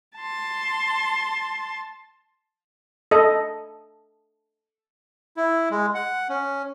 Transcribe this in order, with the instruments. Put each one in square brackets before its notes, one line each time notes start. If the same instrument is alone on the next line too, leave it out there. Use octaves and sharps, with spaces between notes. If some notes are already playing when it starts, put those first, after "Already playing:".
[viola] A5 C6
[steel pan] A4 D#5
[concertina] E4
G#3
F#5
C#4